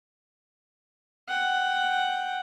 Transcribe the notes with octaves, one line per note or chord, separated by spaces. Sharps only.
F#5 G5